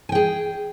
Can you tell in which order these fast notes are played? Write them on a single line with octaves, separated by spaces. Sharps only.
G#5 G5 G#4